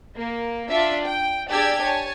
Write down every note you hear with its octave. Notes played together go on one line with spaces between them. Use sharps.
A#3
D4 F4 E5
G5
D4 G4 G#4 D5 E6 G#6
C#5 G#5 A5